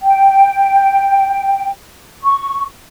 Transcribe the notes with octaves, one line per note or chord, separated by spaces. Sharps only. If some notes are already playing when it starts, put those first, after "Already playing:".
G5
C#6